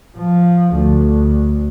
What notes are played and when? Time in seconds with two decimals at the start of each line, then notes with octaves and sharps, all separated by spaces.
0.17 F3
0.74 D2